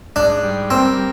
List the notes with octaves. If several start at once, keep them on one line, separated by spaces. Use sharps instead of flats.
G#2 D4
G3
A#3 C4